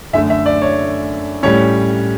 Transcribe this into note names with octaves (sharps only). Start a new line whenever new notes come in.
F#2 D3 A3 E5
E5
D5
C#5
A2 G3 C#4 C#5